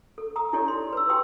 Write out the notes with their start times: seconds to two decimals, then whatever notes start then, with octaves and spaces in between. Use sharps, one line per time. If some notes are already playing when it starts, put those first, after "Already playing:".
0.18 A4
0.36 A#5 D#6
0.53 D#4 E4 G4 A4 C#5 D5
0.68 C6
0.93 B4 E6
1.09 G4 B4 G5 C6 D6 D#6